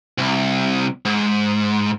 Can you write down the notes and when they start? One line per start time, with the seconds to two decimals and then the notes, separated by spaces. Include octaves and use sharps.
0.18 C2
1.05 G#2